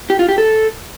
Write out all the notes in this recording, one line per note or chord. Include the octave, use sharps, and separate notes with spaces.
G4
F4
G4
A4